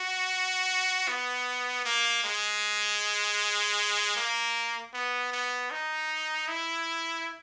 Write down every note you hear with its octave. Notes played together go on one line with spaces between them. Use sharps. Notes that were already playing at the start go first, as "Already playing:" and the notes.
Already playing: F#4
B3
A#3
G#3
A#3
B3
B3
D#4
E4